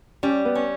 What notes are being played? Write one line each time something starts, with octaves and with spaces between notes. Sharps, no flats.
G3 C#4
B3
C#4